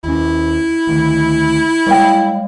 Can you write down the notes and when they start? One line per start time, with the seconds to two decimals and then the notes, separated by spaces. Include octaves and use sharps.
0.04 D#2 C#4 E4
0.87 D2 D#3
1.86 G3 G#3 C#5 F5 G5